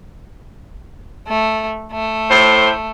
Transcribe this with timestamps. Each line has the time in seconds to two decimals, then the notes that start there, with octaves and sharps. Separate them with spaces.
1.28 A3
1.92 A3
2.30 A2 C5